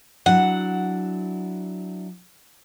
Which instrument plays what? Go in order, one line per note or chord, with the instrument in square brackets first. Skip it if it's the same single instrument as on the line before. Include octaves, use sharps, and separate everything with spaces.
[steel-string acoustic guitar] F#3 D4 E4 [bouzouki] F#5